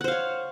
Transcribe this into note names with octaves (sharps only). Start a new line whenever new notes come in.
C5 C#5 F5 F#5